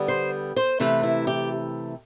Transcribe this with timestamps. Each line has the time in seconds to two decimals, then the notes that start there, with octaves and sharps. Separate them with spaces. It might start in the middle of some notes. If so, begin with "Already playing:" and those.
Already playing: D3 G3 B3
0.08 C5
0.56 C5
0.80 C3 E3 A3 B4
1.03 E4
1.27 G4